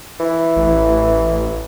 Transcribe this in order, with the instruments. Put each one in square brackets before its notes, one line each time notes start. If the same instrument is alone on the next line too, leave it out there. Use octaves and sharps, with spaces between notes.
[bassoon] E3
[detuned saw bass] A1